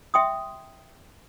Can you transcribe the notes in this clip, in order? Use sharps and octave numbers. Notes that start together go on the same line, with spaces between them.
E5 G5 C6 D#6